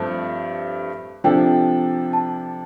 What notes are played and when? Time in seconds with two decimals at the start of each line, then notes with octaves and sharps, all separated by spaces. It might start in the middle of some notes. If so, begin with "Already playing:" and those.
Already playing: G2 F3 A3 C4 A5
1.24 C3 F3 D4 A4 G5
2.13 A5